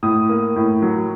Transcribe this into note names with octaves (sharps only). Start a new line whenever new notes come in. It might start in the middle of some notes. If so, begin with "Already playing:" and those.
A2 D#6
A#3
A2
F#3